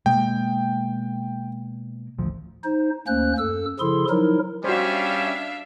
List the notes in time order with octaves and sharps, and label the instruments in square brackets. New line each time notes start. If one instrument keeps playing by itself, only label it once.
[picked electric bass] B2 G#3 A#3 [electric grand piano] G5
[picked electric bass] A1 D2 F3
[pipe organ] D#4 C5
D2 A#3 C#4 C5 F#6
F#2 A4 E6
C#3 F3 E4 G#4 A4 C6
F3 F#3 D#4 E4 A#4
[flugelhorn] G3 [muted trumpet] C#4 [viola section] D4 E5 F5 [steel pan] F#4 C5